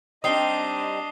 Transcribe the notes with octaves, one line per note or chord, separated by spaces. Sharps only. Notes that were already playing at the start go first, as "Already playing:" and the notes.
G3 C4 D4 D#4 D#5 D#6 C7 G7